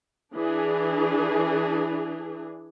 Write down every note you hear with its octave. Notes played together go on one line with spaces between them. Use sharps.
E3 D4 G#4